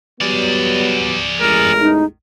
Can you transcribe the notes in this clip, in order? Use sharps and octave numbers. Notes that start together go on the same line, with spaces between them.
F#3 G3 B3 G#4 D5
A1 E2 G#3 A#4
D#4